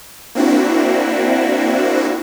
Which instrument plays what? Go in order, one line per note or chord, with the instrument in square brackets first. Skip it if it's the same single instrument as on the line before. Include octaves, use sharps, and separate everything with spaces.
[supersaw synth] A#3 C4 D4 E4 F#4